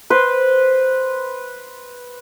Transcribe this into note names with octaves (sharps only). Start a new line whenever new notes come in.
B4 C5